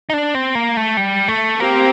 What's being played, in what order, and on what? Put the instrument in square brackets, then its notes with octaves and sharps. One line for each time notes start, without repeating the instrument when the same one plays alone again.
[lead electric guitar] D#4
D4
C4
A#3
A3
G3
A3
[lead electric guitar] A#3 [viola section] C4 G4